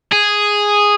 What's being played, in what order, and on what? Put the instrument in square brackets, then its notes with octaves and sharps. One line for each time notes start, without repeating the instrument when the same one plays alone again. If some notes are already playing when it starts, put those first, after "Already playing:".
[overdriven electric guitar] G#4